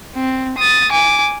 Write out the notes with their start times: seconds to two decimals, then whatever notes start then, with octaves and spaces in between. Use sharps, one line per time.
0.15 C4
0.58 D#6 A6
0.92 G#5 D6